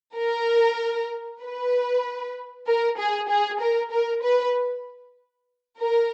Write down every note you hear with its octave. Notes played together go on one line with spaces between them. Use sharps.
A#4
B4
A#4
G#4
G#4
A#4
A#4
B4
A#4